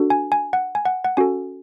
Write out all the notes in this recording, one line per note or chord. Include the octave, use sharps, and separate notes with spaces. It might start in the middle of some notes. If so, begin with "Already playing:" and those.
Already playing: D4 F#4 A4
G#5
G#5
F#5
G#5
F#5
F#5
C#4 F#4 A4 G#5